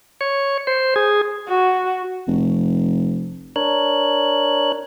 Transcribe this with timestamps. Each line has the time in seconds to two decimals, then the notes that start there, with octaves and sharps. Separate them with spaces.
0.21 C#5
0.67 C5
0.96 G#4
1.48 F#4
2.28 F1
3.56 D4 A#4 C#5 F#6